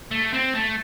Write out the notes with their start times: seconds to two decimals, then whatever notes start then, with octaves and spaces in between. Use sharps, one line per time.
0.11 A3
0.33 C4
0.55 A3